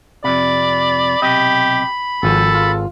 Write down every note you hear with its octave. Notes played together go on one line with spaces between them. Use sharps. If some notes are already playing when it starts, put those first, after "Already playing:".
F2 C3 D5 B5
B1 C3 G4 D#5
G#1 F3 A4
F4